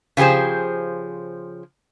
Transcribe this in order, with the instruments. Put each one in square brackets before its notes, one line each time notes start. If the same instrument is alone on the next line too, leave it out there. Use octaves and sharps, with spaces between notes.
[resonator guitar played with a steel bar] C#3 F3 G4 G#4 C5